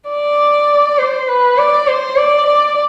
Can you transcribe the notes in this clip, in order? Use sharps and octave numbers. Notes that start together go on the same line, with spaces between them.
D5
C5
B4
D5
C5
D5
D5